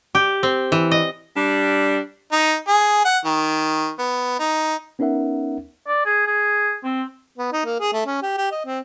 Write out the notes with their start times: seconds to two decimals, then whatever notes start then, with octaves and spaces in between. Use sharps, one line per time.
0.15 G4
0.43 C4
0.72 E3
0.91 D#5
1.36 G3 D4
2.32 D#4
2.68 G#4
3.05 F#5
3.25 D#3
3.99 B3
4.39 D#4
4.99 B3 C#4 D#4 A#4 E5 F#5
5.87 D5
6.06 G#4
6.26 G#4
6.84 C4
7.38 B3
7.53 D#4
7.65 A#3
7.80 G#4
7.93 A3
8.06 C#4
8.22 G4
8.38 G4
8.52 D#5
8.66 C4